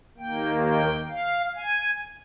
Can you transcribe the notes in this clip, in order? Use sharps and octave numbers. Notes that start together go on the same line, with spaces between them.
D#2 D#3 A#3 G5
G5
F5
G#5